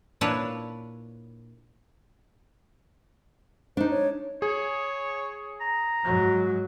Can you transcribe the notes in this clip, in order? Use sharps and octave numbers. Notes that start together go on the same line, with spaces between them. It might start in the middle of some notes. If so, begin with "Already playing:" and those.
A#2 D4 E4 B4 C#5
D4 D#4 C5
C#5
G#4 C#5
A#5
G#2 F#3